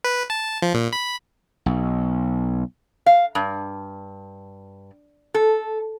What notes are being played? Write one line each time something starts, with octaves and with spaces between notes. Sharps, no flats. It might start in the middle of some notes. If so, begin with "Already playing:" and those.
B4
A5
F3
A#2
B5
B1
F5
G2
A4